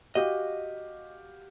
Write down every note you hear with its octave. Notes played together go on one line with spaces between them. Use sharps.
F#4 G4 D#5 F5